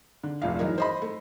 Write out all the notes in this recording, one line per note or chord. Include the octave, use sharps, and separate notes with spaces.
D3
F1 A#1 F5
E3 F#3 D#4 A#4
C5 D#5 B5
A3